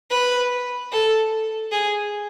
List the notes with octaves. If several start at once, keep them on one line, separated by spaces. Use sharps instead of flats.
B4
A4
G#4